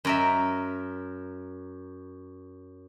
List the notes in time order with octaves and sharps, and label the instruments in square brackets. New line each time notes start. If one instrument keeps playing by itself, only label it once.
[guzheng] F#2 A#4 E5